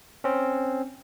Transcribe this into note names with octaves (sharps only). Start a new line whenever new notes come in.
C4 C#4